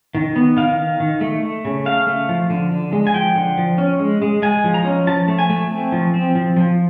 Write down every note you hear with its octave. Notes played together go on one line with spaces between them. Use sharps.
D#3
B3
D#3 F5
D#3
D#3
A3
A3
C#3
A3 F5
A3
F3
D3
D3
G#3
G#5
F3 G5
D3
F3
C#4
G#3
G#3
G#3 G#5
F3
A#5
C#4
F3 A5
A3
G#5
A3
C4
F3
C4
F3
F3